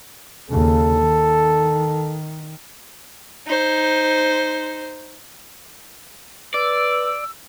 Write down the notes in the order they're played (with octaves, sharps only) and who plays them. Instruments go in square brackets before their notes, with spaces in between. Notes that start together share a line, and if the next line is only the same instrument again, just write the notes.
[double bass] D#2 C#3 [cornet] A4
[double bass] D#3
[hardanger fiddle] D#4 C5
[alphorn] B4 [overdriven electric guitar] D5 [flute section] E6